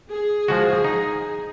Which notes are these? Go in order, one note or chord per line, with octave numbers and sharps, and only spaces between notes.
G#4
F3 G#3 F#4
D#4